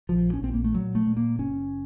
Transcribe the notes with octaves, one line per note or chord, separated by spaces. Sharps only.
A#1 F3
C#4
A#1 C4
A#3
A3
A#2 F#3
A3
A#2
A#3
F#1 C#4